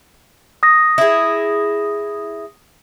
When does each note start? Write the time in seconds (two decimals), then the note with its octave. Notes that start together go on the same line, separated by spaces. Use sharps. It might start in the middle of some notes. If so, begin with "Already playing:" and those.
0.63 D#6 A#6
0.98 E4 G#4